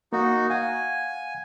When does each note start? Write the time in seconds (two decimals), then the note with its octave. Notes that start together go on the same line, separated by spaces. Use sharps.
0.13 A#3 D#4 F#4
0.50 F5 F#5 G#5